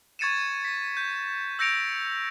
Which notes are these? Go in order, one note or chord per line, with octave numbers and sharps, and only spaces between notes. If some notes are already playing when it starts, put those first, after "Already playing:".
C#6 G#6 A6 C#7 D#7 E7
B6
G6
E6 G6 A#6 C#7 D7 F7